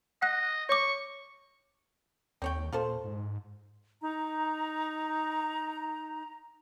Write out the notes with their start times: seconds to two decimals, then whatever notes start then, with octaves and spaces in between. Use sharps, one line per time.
0.22 D#5 F#5 F#6
0.69 C#5 C#6 D6
2.42 D#2 C4 C#5 G5
2.73 A#2 F4 A4 C5
3.05 G#2
4.02 D#4 A#5